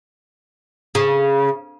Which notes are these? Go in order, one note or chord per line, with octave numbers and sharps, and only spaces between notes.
C#3